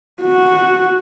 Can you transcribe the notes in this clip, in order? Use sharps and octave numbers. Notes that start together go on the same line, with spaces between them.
F#4